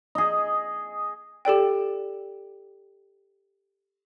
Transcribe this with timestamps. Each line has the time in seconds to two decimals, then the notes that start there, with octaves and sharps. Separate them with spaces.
0.15 G#4 D#5
1.45 G4 A4 D5 G5